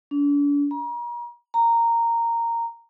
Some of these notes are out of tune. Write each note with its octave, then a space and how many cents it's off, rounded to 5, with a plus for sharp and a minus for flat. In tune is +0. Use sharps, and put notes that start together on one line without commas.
D4 -40
A#5 +40
A#5 -10